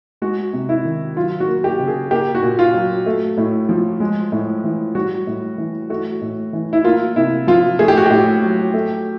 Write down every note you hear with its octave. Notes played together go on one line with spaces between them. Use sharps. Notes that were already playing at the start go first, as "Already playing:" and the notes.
G#3 F#4
C3
E4
D#3
F#3 F4
F#4
A#3
G4
C#3
G#4
A#3 G4
F#4
A#2
F4
F#3
A3
A2
F3
G#3
A2
E3
G3 F#4
A2
E3
A3 F#4
A2
E3
E4
A#3 F4
C3 E4
F3 F4
A3 G#4
G4
F#4
A2 G4
F#3
A3